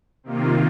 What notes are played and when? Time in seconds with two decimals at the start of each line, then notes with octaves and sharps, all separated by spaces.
0.24 C3 D#3 A#3 F4